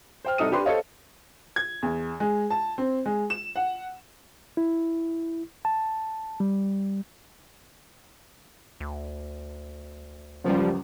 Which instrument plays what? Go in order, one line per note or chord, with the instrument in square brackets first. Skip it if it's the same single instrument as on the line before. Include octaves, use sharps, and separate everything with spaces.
[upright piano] C5 G5 F6
C2 D#4 A4 D#6 F6 D#7
D4 G4 B4 C6
A4 C5 C#5 D#5 F5
G#6
E2
G#3
A5
C4
G#3
E7
F#5
[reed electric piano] E4
A5
G3
[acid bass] D2
[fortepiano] C#2 F#2 [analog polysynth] F3 G3